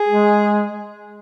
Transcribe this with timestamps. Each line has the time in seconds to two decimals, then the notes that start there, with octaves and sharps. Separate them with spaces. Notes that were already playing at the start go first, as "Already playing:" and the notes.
Already playing: G#4
0.08 G#3